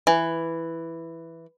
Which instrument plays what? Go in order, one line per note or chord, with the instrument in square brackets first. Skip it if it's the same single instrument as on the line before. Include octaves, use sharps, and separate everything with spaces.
[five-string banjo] E3